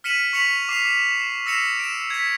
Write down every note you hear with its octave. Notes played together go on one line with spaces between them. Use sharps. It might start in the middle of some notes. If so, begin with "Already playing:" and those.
F6 B6 C#7 D#7 E7 F#7
C#6 B6 C#7 F7 F#7
D6 C7 F7
E6 A#6 C7 C#7 E7 F7
D7 E7
G#6 B6